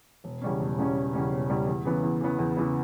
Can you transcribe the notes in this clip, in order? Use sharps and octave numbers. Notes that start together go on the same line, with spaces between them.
E1
E2 C#3 G3 C#4
E1
E2 C#3 G3 C#4
E1
E2 C#3 G3 C#4
E1
E2 C#3 G3 C#4
E2
C#3 E3 B3
E2
C#3 E3 B3
E2
C#3 E3 B3